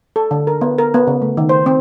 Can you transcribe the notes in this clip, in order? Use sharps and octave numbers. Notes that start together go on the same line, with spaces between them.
A4
D3
A#4
B3
A#4
B3
C#3
A3
D#3
C5
C4